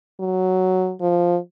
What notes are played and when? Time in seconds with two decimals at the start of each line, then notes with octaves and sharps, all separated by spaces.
0.20 F#3
1.01 F3